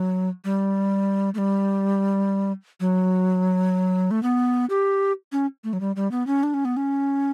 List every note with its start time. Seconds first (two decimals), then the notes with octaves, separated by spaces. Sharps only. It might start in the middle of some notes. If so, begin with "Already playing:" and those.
Already playing: F#3
0.45 G3
1.35 A3
1.38 G3
2.80 F#3
4.11 A3
4.23 B3
4.70 G4
5.32 C#4
5.64 A3
5.73 F#3
5.81 G3
5.96 G3
6.12 B3
6.27 C#4
6.43 D4
6.54 C#4
6.65 B3
6.77 C#4